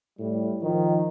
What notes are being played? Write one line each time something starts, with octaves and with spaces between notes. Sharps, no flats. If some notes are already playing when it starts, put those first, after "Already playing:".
A2 G3
D#3 F3